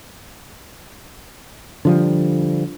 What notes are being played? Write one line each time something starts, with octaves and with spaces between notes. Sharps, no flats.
D3 F3 G3